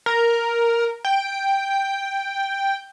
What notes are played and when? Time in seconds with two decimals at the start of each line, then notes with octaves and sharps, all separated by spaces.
0.06 A#4
1.05 G5